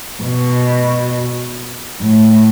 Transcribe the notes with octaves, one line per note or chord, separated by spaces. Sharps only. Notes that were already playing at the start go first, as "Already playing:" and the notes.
B2
A2